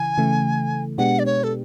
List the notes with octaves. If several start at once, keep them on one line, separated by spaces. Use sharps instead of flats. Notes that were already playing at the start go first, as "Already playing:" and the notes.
Already playing: C#3 E3 G#5
C#3 E3 A3
B2 G#3 B3 D4 G4 F#5
D5
C#5
A4